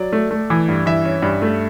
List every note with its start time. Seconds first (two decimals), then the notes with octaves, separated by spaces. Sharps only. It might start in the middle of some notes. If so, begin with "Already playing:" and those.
Already playing: F#3 D5
0.13 A3
0.31 A3
0.50 E3
0.69 G2
0.86 E3 E5
1.05 C#4
1.22 G2
1.42 A3